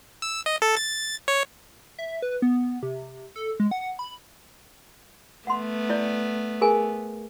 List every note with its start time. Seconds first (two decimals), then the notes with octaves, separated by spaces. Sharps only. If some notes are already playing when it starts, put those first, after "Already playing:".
0.22 E6
0.46 D#5
0.62 A4
0.77 A6
1.28 C#5
1.99 E5
2.22 B4
2.42 B3
2.83 C3
3.36 A4
3.60 G#3
3.71 F#5
3.99 B5
5.47 A3 B3 F#5 C6
5.90 E4 D5
6.61 G#4 A#4 G#5